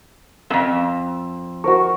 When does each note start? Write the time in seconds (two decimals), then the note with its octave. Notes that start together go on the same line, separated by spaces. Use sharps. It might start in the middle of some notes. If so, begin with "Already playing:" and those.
0.50 F2 G#2 E6
1.64 F#4 A#4 C5 C#6